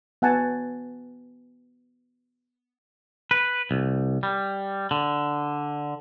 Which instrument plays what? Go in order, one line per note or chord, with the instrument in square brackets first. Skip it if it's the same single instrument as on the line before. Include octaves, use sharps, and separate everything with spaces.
[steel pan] B3 F#5 G#5 A5
[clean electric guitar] B4
C2
G3
D3